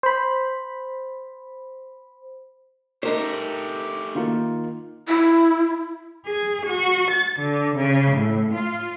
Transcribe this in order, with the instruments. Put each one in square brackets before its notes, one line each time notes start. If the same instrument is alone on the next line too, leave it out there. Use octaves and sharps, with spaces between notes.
[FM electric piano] C5 B5
[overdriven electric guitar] A3 G4 [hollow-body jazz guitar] D#4 A#4 C5
[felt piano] D#3 A#3 F4
[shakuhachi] E4
[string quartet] G#4
F#4
A6
D3
C#3
A2
F4